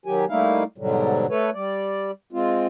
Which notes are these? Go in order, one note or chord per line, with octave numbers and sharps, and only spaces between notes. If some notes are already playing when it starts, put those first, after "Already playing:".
D#3 F#3 G4 G#5
G3 A3 A#3 D#4 E4 F5
G#2 B2 D3 F#3 G3
A3 A4 B4 C#5
G3 D5
G#3 C4 F4